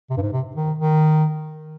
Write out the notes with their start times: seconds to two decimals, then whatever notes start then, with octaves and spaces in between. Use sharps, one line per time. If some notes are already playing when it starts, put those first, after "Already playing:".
0.10 C3
0.17 G2
0.22 G#2
0.32 C3
0.56 D#3
0.78 D#3